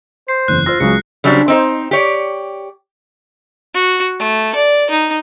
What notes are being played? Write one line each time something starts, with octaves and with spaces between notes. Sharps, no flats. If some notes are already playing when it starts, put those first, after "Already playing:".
C5 C7
F#1 E2 E3 F#6
F4 C5 E6 A#6
C#2 C#3 F#3 C#7
C#3 F#3 G3 C4 D4
C4 D#4 C5
G4 C#5 D5
F#4
A3
D5
D#4